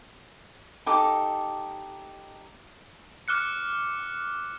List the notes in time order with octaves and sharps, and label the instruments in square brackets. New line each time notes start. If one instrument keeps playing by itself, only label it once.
[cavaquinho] D#4 G4 A4 D6
[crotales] D6 F6 F#6 C#7